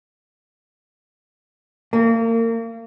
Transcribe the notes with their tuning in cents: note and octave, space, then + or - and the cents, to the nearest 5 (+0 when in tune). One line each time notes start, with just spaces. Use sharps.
A#3 -35